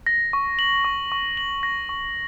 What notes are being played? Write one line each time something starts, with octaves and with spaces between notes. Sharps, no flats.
A#6
C#6
F#7
C#6
C#6
F#7
A#6
C#6